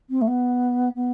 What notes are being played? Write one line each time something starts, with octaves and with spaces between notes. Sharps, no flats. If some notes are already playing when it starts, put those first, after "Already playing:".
C4
A3
B3
B3